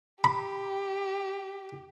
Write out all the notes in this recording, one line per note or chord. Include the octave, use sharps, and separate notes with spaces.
G4 B5